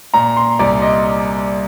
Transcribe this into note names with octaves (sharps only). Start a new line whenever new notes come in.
A#2 A#5
C6
C2 D5
D#5